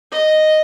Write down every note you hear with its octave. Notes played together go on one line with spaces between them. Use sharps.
D#5